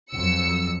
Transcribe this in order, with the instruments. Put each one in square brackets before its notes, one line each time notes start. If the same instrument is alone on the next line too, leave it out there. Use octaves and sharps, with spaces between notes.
[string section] F2 F#3 E6 C#7